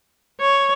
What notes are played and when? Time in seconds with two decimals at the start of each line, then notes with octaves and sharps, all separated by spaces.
0.41 C#5